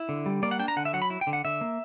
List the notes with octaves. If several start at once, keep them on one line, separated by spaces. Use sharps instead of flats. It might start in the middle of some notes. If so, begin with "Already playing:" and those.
Already playing: E4
D3
G3
A#3 D5
F#5
D4 G5
A#5
D3 F#5
E5
F#3 F#5
B5
E4
G5
D3
F#5
D3 E5
A#3